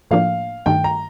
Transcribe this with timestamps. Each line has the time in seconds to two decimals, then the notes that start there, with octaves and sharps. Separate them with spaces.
0.11 A2 F3 A#3 D4 F5
0.66 G2 D#3 A3 G5
0.84 A#5